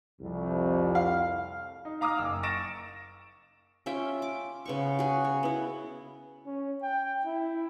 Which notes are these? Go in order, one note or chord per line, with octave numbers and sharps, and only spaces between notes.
C2 F2
F5
D#4
F5 A#5 D6 D#6 F6
F#1 E6
C#6 A6 A#6 D7 E7
C#4 F4 E5 G5
D6
C#3 B3 C#6
F#4 G#4
C#5
B3 E4
C#4
G5
E4